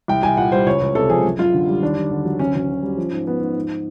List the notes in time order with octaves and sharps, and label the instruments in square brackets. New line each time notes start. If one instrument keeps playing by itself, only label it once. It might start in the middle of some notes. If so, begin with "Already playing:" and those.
[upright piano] C2 G5
C2 G#5
A#2 F#5
G3 C5
C#2 C#5
C#2
C3 A4
F3 G#4
F#2
F#2 F4
D3
G3
D#2 D4
D#2
D3
F#3
D2 C#4
D2 C#4
D3
G3
F3
G#2
F3 B3
G#2
G#2